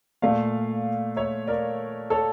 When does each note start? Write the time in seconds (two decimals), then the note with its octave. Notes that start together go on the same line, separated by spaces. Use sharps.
0.22 A#2 A3 D5 F5
1.17 C#5 E5
1.47 A#4 D5
2.10 A4 C#5